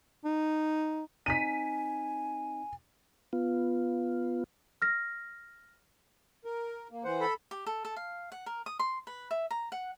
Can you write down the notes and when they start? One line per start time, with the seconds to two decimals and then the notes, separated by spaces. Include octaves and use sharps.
0.25 D#4
1.26 C4 D#4 G#5 B6 D#7
3.33 B3 F4
4.82 F6 A#6
6.45 A#4
6.90 A#3
7.04 E3 C5 F#5
7.21 A4 B5
7.51 G4
7.66 A4
7.85 A4
7.96 F5
8.32 F#5
8.46 A#4
8.66 D#6
8.79 C6
9.07 B4
9.31 E5
9.51 A#5
9.72 F#5